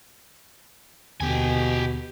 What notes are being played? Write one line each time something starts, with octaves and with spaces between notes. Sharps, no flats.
D#2 B2 D3 B3 G4 G#5